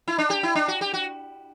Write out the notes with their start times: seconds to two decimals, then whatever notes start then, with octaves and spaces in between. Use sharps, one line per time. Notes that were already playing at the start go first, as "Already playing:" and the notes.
0.08 E4
0.18 D4
0.30 G4
0.43 E4
0.55 D4
0.68 F#4
0.81 G4
0.94 F#4